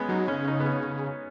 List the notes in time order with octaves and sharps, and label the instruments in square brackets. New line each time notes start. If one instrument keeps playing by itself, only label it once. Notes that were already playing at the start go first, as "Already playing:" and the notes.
Already playing: [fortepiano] G#3 B3 C#4
[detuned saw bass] F#3 [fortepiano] D#4
[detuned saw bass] C#3 [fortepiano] C#4
[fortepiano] D#4
B3
C#4